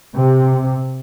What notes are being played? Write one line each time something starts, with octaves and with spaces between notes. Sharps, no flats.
C3